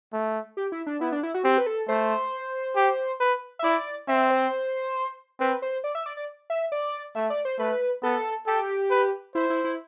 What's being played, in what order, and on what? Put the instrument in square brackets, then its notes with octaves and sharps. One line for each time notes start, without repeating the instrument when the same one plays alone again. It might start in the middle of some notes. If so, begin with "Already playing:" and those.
[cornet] A3
[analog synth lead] G4
E4
D4
[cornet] B3 [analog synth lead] E4
[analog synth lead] D4
E4
F#4
[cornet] C4 [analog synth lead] G4
[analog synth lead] B4
A4
[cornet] A3 [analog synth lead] C5
[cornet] G4
B4
[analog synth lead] E5
[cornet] E4 [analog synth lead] D5
[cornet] C4 [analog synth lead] E5
[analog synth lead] C5
[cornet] C4 [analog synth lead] B4
[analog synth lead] C5
D5
E5
D5
D5
E5
D5
[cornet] A3 [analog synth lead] E5
[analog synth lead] D5
C5
[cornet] A3 [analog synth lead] B4
[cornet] B3 [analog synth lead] A4
[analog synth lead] G4 [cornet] A4
[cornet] B4
[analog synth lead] E4 [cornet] C5
[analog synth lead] E4
E4